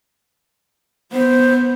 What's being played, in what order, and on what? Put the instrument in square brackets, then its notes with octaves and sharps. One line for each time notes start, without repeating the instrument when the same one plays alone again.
[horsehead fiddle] B3 [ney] C5